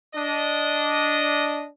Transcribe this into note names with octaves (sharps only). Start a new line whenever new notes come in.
D4 D#5